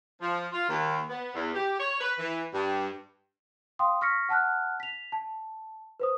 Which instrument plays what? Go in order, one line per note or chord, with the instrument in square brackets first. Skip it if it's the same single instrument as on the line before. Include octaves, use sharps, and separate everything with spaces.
[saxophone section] F3
F4
D#2
B3
E2
G4
C#5
B4
E3
G2
[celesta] F5 G5 C6 D#6
C#6 F6 A#6 B6 C#7
F#5 A5 F6 F#6
B6 F7
A5
B4 C5 D#6